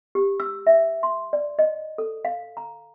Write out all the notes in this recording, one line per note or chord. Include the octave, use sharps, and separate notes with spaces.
G4
E6
E5
C6
D5
D#5
A4
F5
A#5